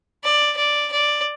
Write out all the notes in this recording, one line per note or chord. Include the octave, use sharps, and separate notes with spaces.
D5
D5
D5